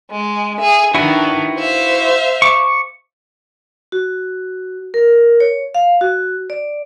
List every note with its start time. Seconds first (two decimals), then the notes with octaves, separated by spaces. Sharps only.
0.13 G#3
0.59 G#4 E5
0.95 D#3 D4 E4 F#4 B4
1.57 C5 E5 F5
2.42 C#6 D6
3.92 F#4
4.94 A#4
5.40 C#5
5.75 F5
6.01 F#4
6.50 D5